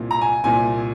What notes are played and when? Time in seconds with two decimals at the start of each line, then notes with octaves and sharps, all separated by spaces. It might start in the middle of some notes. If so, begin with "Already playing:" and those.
Already playing: C2 A#2
0.11 A#5
0.21 G#5
0.44 C2 A#2 G#5